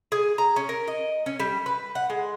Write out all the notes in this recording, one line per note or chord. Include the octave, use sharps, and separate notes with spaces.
G#4
A#5
C#4
A#4
D#5
C#4
G3
B4
F#5
G#3